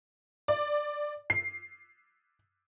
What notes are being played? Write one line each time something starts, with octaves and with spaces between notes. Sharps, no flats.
D5
C7